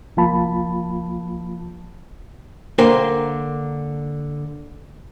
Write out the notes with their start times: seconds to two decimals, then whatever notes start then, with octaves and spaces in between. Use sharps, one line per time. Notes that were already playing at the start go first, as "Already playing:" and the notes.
0.17 C2 F3 A#3 F4 A5 B5
2.78 D3 A#3 A#4 C5 G5 C6